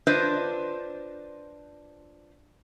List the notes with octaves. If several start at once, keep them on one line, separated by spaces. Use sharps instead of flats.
D4 F4 B4 C5 D#5